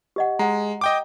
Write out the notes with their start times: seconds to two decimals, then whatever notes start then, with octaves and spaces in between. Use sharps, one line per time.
0.16 G4 D#5 F#5
0.39 G#3 F#5 A#5
0.81 D#5 G5 D6